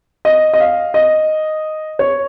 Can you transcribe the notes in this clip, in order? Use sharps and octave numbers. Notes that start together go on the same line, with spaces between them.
D#5
D#5
F5
D#5
C#5